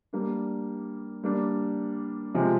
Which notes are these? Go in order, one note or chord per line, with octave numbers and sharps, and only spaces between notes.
G3 A#3 D4
G3 A#3 D4
C3 F3 G#3